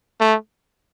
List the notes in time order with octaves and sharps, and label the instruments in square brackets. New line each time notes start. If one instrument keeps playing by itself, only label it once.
[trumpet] A3